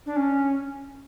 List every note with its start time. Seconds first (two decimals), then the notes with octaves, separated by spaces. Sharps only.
0.06 D4
0.16 C#4